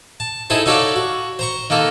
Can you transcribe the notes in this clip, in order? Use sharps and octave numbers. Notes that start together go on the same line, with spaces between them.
A5
D#4 E4 G#4 A4 C5
D#4 F#4 A4 C#5 D5 F5
F#4
C5 A#5 C#6
D#3 A#3 A4